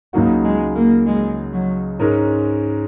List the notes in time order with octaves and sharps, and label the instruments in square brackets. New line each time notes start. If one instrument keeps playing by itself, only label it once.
[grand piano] C#2 C#3 F#3 D#4 F#4 [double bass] A#3
[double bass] G#3
A#3
G#3
F#3
[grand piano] G#2 G#3 C#4 A#4